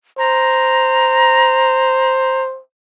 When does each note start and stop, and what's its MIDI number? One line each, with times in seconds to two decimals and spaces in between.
0.18 2.61 72
0.18 2.42 82